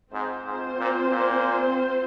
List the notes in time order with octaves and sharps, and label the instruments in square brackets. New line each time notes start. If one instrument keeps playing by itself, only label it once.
[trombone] G#2 [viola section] C4 F4 C5
[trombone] G#2
A#2
A#2